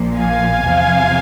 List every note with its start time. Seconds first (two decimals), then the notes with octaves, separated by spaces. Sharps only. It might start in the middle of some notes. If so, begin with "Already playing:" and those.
Already playing: A#1 A#2 F3
0.16 F5 G#5
0.62 E2 C3 F3